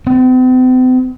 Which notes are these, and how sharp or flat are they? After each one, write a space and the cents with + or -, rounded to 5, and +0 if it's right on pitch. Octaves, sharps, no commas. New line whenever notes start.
C4 -45